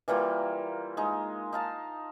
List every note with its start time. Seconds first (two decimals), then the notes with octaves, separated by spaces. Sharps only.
0.08 E3 G3 A#3 F4
0.97 G#3 D#4
1.53 D#4 F5 A5